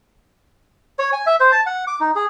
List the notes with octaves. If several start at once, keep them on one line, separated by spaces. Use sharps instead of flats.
C#5
G#5
E5
C5
A5
F#5
D6
D#4
G#4